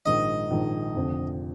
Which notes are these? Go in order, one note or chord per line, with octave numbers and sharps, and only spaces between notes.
A#1 G#2 D#3 G#3 D#4 D#5
A#1 G#2 D#3 G#3 D#4
F1 F2 D3